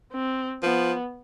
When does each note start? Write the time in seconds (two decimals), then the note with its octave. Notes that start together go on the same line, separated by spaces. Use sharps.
0.13 C4
0.63 F3 B3